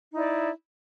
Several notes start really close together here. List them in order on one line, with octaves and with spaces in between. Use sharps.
D#4 E4 D5